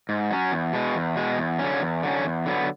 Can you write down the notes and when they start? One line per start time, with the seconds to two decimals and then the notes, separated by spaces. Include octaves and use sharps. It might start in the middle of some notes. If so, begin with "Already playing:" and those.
0.09 G#2
0.31 F#3 C#4
0.52 E2
0.73 B2 G#3
0.95 E2
1.16 B2 G#3
1.38 E2
1.59 D3 F#3 C#4
1.81 E2
2.03 D3 F#3 C#4
2.25 E2
2.46 D3 F#3 B3